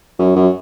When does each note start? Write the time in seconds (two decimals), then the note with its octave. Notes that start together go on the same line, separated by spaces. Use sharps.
0.19 F#2
0.36 F#2